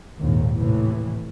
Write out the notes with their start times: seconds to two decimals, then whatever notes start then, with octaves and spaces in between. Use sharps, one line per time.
0.19 A#1 D#2 G#2
0.57 A2 C3 E3